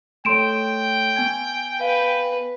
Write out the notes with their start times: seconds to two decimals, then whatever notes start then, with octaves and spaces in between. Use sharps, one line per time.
0.25 A3 A4 C#5 G5 C6 D7 E7
1.16 B3 G#5 G#6
1.81 B4 F5